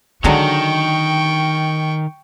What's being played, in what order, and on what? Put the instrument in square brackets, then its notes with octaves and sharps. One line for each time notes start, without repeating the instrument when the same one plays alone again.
[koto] D3 F#3 G#3 [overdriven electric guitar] D#3 [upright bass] D4 [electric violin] G5 C#6